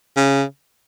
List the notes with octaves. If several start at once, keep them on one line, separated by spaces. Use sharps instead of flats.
C#3